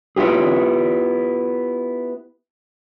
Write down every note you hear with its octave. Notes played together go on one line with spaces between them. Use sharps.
B3 E4 F4 G4 G#4